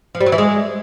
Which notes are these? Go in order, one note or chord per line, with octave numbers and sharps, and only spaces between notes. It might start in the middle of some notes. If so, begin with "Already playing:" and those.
F3
G3
F#3
E3
G#3